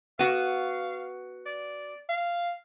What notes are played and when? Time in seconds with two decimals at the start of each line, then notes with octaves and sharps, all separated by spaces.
0.19 B3 F#4 F5
1.46 D5
2.09 F5